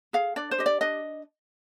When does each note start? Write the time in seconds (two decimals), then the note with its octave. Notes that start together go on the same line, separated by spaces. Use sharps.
0.13 G#4 F5
0.36 D4 D5
0.51 C5
0.58 G4 D#5
0.66 D5
0.81 D4 D#5